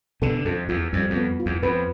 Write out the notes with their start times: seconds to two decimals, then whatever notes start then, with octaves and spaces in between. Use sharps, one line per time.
0.22 B2 D3 A4
0.45 F2 A4
0.69 E2 F4
0.92 F2 G3
1.10 F2
1.16 B3
1.40 F4
1.46 E2
1.62 F2 B4